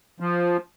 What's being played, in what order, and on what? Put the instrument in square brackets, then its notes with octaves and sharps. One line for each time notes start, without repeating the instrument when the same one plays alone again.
[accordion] F3